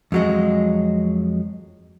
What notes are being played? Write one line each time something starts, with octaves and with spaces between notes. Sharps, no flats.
F2 F#3 G#3